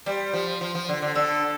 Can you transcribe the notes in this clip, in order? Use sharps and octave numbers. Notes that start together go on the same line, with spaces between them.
G3 C5
F3
F3
F3
D3
D3
D3 A4